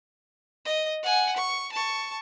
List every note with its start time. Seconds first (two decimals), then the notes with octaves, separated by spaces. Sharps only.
0.65 D#5
1.03 F#5 G#5
1.36 C#6
1.72 A5 C#6